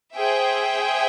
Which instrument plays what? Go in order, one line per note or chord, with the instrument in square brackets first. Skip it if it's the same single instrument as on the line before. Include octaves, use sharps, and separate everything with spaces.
[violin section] G#4 C5 E5 G5